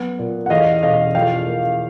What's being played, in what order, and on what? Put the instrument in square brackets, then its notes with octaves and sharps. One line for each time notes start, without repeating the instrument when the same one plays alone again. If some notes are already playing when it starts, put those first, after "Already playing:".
Already playing: [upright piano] F#3 B3
A#2
F#5
E2 D#5 F5
B2 D#5 F5
F3 F5 G5
A#3